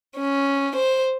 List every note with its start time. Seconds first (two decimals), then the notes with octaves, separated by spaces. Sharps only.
0.17 C#4
0.76 C5